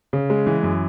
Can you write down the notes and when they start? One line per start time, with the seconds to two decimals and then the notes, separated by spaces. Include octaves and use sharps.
0.13 C#3
0.30 G#3
0.47 E3
0.63 F#2